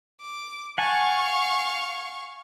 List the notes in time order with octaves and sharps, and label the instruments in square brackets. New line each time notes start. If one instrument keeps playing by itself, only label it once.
[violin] D6
[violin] F5 C#6 [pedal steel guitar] F#5 G#5 A5